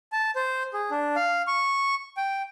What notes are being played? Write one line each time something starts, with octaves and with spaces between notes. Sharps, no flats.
A5
C5
G#4
D4
F5
C#6
G5